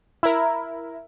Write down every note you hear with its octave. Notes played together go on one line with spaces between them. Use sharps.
E4 A#4